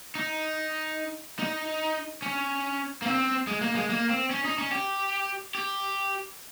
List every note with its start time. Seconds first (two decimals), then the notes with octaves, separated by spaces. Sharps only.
0.15 D#4
1.39 D#4
2.22 C#4
3.02 A#3
3.06 C4
3.47 G#3
3.61 A#3
3.75 G#3
3.89 A#3
4.09 C4
4.30 C#4
4.45 D#4
4.58 C#4
4.72 G4
5.55 G4